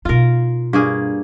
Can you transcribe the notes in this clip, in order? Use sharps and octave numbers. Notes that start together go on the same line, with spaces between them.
B2 D#4 F4 A#4
G2 A#3 G#4